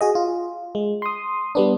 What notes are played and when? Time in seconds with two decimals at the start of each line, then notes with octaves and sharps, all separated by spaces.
0.01 F#4 G#4 D#5
0.15 F4
0.75 G#3
1.02 C6 D#6
1.55 G3 B3 D4